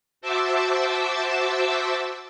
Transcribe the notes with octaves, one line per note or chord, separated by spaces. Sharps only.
F#4 C5 E5 A5 D6 E6